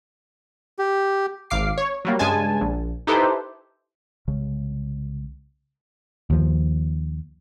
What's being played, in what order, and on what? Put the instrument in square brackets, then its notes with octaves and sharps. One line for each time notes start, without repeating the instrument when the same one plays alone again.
[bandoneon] G4
[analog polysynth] G#1 F5 D6 C7
C#5
F#3 G3 A#3
G2 C#3 G#3 G#5 A5
A#1
D#4 E4 G4 A4 B4 C5
[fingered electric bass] C2 C#3 G#3
[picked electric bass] D#2 F3